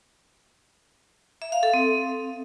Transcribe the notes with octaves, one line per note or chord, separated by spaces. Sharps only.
E5
F5
A4
C4